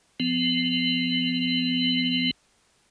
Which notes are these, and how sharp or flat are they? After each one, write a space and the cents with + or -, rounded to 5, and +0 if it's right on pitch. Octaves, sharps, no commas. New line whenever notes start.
F3 +0 B3 +35